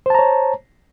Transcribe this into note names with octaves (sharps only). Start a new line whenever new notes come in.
C5 C#5 A5 A#5